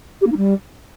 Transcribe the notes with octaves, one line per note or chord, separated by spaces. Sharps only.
G4
A#3
D#4
G3